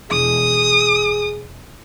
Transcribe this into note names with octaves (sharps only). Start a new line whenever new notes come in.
E1 G#4 D#6